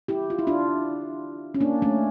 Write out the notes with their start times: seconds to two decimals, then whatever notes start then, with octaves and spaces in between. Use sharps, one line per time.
0.08 E4 G4
0.30 F4
0.39 E4
0.47 D4 F4
1.54 C#4
1.61 A#3 D4
1.82 A3 C#4